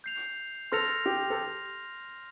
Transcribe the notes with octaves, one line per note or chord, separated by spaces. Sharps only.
G6 C7 F7
A4 C6 F6 A#6 F7
G4
A4